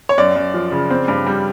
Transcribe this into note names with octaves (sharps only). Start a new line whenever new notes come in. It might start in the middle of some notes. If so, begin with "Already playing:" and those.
C#5
F#2 D5
F#2
F3
C#3
C4
G2
G3